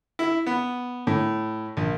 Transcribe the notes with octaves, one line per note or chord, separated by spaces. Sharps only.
E4
B3
A2
A#1